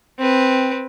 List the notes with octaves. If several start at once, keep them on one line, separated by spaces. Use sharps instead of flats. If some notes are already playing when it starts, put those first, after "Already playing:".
C4 B4